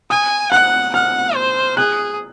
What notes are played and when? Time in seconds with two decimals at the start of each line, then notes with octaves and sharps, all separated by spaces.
0.10 G#5 D#6
0.52 F#5 F#6
0.94 F#5 F6
1.35 C5
1.77 G#4 F#6